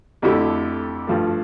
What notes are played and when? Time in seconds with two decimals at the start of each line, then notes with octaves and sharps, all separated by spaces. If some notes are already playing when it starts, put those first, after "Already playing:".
0.22 F2 D3 A3 E4 G4
1.07 G2 F3 A3